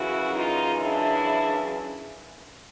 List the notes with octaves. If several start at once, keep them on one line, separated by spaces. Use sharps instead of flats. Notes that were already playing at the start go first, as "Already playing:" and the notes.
Already playing: F#2 C#3 E3 E4 F#4
D#4 F4
D4 E4